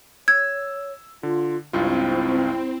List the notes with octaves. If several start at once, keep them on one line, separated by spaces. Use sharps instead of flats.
C#5 E6 G#6
D3 F4
C#2 G2 C4 E4 F4